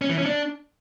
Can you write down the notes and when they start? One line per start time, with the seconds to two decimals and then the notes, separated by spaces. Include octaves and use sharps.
0.01 C#4
0.10 E3
0.18 C#4
0.26 D4